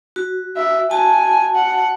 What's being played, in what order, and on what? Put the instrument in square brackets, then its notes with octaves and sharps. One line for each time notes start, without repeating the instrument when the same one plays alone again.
[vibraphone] F#4
[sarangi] E5
[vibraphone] F#4 A5 [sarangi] G#5
[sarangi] F#5